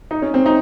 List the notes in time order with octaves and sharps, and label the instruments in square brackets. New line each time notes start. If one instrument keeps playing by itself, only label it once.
[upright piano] D#4
C#4
C4
D#4